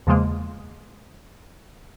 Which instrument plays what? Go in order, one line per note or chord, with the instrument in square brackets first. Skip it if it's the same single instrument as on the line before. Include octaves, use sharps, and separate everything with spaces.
[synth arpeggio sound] E2 C#3 F3 G#3 A#3